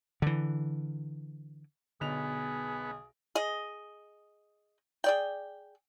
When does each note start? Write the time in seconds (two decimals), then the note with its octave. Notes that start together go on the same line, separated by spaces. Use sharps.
0.22 D3 E3
2.01 B1 D3 B3 G#4 F7
3.35 G#4 D#5
5.04 G#4 D5 G5